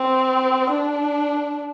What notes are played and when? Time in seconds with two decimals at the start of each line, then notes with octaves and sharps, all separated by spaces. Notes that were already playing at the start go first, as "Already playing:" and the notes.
Already playing: C4
0.70 D4